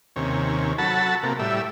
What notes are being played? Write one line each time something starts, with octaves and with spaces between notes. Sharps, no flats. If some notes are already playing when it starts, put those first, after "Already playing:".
D#2 C3 C#4
F#3 F#4 A4 A5 B5
C3 A#3
A2 G3 E5